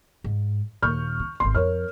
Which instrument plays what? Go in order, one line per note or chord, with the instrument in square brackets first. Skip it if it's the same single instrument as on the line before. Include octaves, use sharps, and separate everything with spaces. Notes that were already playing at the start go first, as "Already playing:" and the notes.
[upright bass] G#2
[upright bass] D#2 A#2 [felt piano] C#6 F6 G6
[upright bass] D#4
[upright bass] G#1 D#2 [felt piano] C6
[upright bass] F2 [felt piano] A#4 C#5 F6